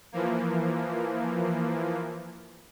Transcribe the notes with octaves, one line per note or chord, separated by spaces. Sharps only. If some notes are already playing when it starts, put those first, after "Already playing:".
E3 F3 A#3